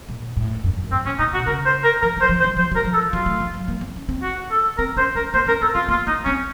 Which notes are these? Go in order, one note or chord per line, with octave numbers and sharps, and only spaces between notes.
A#2
A2
F#2
F2
F#2
A2 C4
A#2 C#4
A#2 D#4
C3 F#4
C#3 A#4
C5
A#4
F3 A#4
F#3 C5
F3
C5
F#3
F3 C5
F#3 A#4
F3
A4
F#3 F4
A3
F3
F#3
A#3
C4
C#4
C4
F#4
A4
C4 A#4
C#4 C5
C#4 A#4
A#3 C5
C#4 A#4
C4 A4
C4 F4
A#3 F4
A#3 D#4
C4 C#4